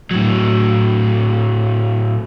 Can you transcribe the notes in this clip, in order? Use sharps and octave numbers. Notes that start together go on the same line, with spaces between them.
A2 F#3